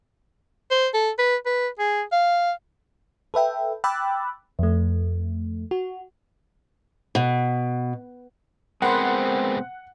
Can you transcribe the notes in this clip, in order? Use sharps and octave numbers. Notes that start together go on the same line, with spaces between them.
C5
A4
B4
B4
G#4
F5
A4 B4 E5 G5
G5 B5 D6 E6 F#6 A6
F2 A3
F#4
B2
G#3 B3 C4 A#4 C5 F#5 B5 C6